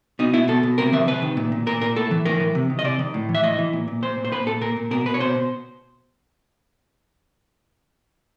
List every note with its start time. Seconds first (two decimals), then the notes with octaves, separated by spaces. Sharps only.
0.19 B2 D#4
0.34 B2 E4
0.48 B2 A4
0.63 B2
0.78 C3 A#4
0.93 D#3 E5
1.07 C3 B4
1.22 D#3
1.37 A#2
1.52 A#2
1.66 A#2 A#4
1.81 A#2 A#4
1.96 A2 A4
2.11 E3
2.25 A2 A#4
2.40 E3
2.55 C3
2.70 D#3
2.79 D#5
2.84 C3 D5
2.99 D#3
3.14 A2
3.29 E3
3.35 E5
3.43 A2 D#5
3.58 E3
3.73 A#2
3.88 A#2
4.02 A#2 C5
4.17 A#2
4.25 C5
4.32 A#2 B4
4.46 A#2 A4
4.61 A#2 A#4
4.77 A#2
4.91 B2 A#4
5.06 B2 B4
5.14 C#5
5.20 B2 C5
5.35 B2